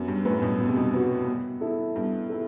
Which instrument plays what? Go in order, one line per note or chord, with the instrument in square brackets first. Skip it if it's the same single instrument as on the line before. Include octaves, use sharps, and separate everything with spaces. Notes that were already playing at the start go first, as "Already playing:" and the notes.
Already playing: [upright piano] F#2 [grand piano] B3
[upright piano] G2
[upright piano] F#2 A2 [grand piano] F#4 B4
[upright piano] G2 B2
[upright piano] B2 [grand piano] B3
[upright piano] C3
G2 B2
[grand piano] F#4 B4
B3
E4 A4
[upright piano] G2 [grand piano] B3
[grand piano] E4 A4